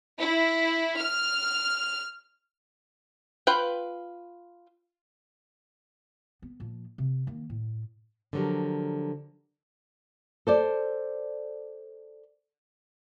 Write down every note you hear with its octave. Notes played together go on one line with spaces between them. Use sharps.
E4
F6
F4 B4 F#5 G5
B3
A#2 F3
C3
D#3 A#3
A2
D3 F3 F#3 G4 A#4
A4 C5 D5